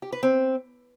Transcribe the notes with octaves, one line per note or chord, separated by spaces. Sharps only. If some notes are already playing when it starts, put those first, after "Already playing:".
G4
B4
C4